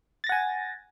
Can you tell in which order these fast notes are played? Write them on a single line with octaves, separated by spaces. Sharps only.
A6 A#6 F#5 G#5